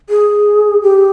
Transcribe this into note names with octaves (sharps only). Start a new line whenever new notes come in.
G#4
G4